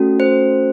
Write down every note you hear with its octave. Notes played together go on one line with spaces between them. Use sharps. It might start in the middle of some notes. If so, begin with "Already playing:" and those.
Already playing: A3 C#4 F#4 A4
C5